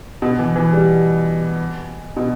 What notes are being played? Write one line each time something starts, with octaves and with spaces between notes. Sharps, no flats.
B2
E3
E3
G3
B2